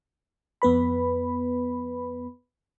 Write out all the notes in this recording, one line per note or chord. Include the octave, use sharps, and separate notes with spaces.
F2 B3 B4 B5